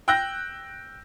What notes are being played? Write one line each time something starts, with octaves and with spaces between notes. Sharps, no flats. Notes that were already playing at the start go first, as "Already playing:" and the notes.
G5 E6 F#6 G6 A#6